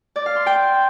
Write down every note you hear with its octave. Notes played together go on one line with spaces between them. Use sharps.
D5
F5
C6
G5